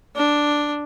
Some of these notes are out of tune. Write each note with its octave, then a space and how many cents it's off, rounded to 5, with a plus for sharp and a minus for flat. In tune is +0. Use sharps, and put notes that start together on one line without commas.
D4 +0